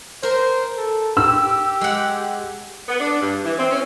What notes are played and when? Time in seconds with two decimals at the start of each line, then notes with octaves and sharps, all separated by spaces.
0.23 A#4 C5 C6
0.77 A4
1.17 G4 E6
1.81 G#3 F#5
2.88 B3
3.00 D4
3.21 G2
3.44 E3
3.59 C4
3.71 C#4